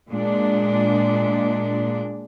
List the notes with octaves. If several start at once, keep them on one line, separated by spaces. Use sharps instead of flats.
A#2 G#3 D4